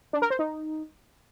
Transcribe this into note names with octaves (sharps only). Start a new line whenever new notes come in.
D4
A#4
C5
D#4